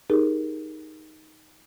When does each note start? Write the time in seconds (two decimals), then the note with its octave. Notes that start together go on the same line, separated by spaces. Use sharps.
0.10 D#4 G4 G#4 A#4